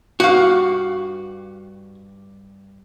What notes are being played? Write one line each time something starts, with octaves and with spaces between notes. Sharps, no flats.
G2 F#4 G4 F5